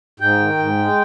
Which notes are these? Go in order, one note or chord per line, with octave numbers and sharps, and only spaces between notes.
G#2 G5
D#3
G#2
G#3